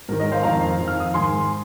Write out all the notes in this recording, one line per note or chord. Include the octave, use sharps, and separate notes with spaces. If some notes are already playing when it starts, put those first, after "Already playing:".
G#2 D#3 A#4
A#4 D#5
C5 F5
F2 D#3 F5 A#5
F2 D#3
F6
D#6
G#2 D#3 G#5 C6